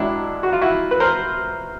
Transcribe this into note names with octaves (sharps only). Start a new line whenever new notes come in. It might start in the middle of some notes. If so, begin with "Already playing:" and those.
Already playing: G#2 D#3 F#3 D4 E4
F#4
F4
E4 F#4
B4
A#4 C5